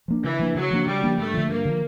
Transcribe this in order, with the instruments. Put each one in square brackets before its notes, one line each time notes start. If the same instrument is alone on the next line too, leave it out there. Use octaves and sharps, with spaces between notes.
[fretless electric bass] F3 A#3 D4
[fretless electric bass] C#3 [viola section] E3
[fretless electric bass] F3 A#3 D4
[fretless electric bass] C#3 [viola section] F#3
[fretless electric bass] F3 A#3 D4
[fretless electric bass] C#3 [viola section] G3
[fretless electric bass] F3 A#3 D4
[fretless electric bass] G2 [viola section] A3
[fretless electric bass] D3 F3
[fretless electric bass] G2 [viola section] A#3
[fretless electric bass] D3 F3